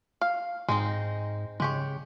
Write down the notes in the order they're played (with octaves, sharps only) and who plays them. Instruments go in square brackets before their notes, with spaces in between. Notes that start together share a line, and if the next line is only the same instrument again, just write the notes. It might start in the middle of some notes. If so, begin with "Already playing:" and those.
[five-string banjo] F5
[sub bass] G#2 [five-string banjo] G#3 C4 D#4
[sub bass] C#3 [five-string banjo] G#3 G4 C#5